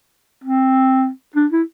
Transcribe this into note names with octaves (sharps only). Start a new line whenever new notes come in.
C4
D4
E4